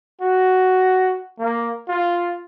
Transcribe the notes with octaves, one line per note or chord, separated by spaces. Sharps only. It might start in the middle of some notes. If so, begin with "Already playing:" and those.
F#4
A#3
F4